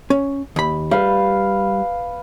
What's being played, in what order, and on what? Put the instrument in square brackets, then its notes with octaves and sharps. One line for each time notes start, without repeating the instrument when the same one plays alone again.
[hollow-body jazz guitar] C#4
D#2 B5
[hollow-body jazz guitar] G3 [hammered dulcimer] B4 F5